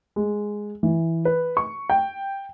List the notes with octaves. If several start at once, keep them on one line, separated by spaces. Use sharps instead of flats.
G#3
E3
B4
C#6
G5